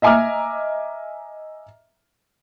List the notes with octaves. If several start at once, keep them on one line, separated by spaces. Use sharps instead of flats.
D#5 E5 G#5 A#5 D6 F6